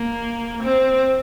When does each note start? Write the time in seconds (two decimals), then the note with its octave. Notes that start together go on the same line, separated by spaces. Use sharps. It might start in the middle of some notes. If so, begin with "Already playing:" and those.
Already playing: A#3
0.63 C4